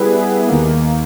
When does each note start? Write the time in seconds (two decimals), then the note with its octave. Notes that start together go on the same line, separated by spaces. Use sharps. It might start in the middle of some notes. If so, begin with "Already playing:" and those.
Already playing: G3 B3 E4 G#4 B4
0.48 D#2 D#3 A#3